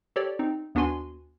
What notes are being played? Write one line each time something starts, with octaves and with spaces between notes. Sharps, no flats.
G4 A4 C#5 D5
C4 D#4
D#2 B3 D4 F#4 G#5 C6